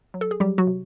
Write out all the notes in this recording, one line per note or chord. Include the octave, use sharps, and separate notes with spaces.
F#3
A4
G#4
F#3 G3 G4
F#3 F#4
C3